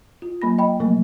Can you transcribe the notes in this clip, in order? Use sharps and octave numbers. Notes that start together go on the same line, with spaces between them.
F4
F#3 A#3 B5 A#6
D#5 G5 B5
C3 F3 F#3 A3 A#3